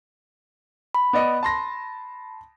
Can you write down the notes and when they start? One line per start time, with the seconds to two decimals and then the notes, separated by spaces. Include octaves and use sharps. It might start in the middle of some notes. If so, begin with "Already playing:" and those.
0.95 B5
1.13 B3 D5 D#5
1.43 A5 C6 A#6